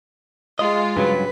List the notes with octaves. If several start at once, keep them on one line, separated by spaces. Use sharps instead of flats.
G#3 F4 D#5
G2 C#3 F#3 B4